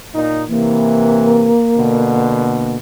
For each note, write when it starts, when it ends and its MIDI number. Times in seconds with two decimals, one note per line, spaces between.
0.14 0.43 46
0.14 0.43 63
0.49 1.51 48
0.49 1.51 52
0.49 2.76 58
1.75 2.77 47
1.75 2.77 50